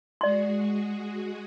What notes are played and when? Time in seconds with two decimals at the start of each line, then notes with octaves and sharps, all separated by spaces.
0.21 G#3 F#4 G#4 D5 C6